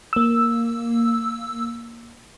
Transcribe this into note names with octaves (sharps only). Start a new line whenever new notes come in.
A#3 E6